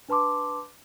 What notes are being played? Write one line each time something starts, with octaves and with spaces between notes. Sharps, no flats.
D4 B4 A5 C6 D6